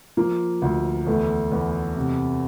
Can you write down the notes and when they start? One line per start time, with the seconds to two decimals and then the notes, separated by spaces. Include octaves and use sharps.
0.17 F3 A#3
0.62 D2
1.06 E2 A3
1.52 E2
1.96 C3